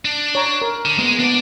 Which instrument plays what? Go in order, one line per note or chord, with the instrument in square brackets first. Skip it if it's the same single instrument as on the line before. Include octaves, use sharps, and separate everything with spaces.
[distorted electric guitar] D4
[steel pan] C#5 A#5
A#4
[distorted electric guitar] D3
[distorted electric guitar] G#3 [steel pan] A#3 B3
[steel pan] B3 [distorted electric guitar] D4 D5